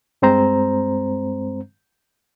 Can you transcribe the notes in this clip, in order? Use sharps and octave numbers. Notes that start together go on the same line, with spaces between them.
G2 G#3 C4 C5 A#5